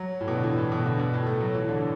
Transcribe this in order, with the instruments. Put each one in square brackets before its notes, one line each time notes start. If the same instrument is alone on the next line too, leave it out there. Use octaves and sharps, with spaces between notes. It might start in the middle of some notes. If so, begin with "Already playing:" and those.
Already playing: [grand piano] F#3
A2
B2
D3
E3
A2
B2
D3
B2
A2
A3
F#3
E3
D3